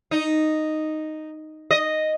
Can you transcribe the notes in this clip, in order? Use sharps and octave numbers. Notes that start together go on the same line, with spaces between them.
D#4
D#5